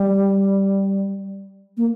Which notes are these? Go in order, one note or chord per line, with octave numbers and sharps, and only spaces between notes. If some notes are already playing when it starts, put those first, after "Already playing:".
Already playing: G3
A#3